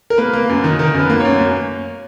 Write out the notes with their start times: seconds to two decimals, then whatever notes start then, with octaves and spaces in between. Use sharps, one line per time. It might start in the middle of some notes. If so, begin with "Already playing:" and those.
0.10 A#4
0.18 A#3 B4
0.33 A#3
0.49 F#2
0.64 D#3
0.79 D#3 A#4
0.94 F#2 B4
1.10 A#3
1.20 C#5
1.25 F#2
1.40 A#3